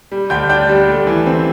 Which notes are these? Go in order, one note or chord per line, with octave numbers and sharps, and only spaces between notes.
G3
D2 G5 G6
D4 G5 G6
G3
A3
E3
C4